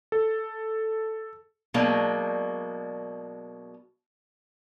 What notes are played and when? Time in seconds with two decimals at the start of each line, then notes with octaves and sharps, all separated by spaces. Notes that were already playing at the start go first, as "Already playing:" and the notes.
0.12 A4
1.74 B2 F#3 G#3 A#3 D4